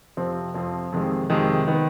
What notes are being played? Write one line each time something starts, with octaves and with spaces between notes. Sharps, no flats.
F2 C3 F3 C4
F2 C3 F3 C4
F2 C3 D#3 G#3
F2 C3 D#3 G#3
D#3 B3